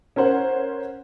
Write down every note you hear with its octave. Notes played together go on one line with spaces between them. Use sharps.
C#4 A#4 C5 F#5